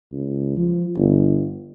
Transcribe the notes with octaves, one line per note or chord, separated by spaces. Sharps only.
C#2
F3
G1